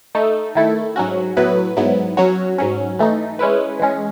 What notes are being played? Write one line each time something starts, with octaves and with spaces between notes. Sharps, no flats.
A3 D#4 A4
D#3 A3 E4 A4
G#2 F#3 C#4 F#4
A2 F#3 B3 E4 B4
G#2 F#3 B3 E4
F#3 C#4 F#4 C#5
G#2 F#3 C#4
E3 A3 D#4
G#3 C#4 E4 B4
E3 G#3 C#4